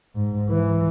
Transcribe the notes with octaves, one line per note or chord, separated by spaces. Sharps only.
G#2
E3